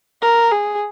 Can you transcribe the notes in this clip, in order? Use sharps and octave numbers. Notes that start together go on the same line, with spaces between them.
A#4
G#4